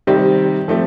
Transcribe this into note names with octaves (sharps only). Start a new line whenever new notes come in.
C3 D#3 G3 C4 G4
F3 A3 C4 G4